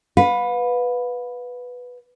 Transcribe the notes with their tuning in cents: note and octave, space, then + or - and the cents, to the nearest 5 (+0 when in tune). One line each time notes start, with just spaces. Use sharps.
B4 +0 F5 +45